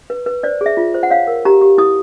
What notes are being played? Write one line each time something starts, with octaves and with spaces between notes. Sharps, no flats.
B4
B4
C5 D5
G#4 E5
F4
C5
F#5
C#5 F5
A#4
G4 A#5
G4
E4 D#6